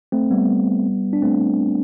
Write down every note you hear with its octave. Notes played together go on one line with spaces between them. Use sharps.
A3 C4
G3 B3
D4
A3 C4